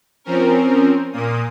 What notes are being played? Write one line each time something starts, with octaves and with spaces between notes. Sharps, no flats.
F3 C4 C#4 A#4
A#2 A#3 D#6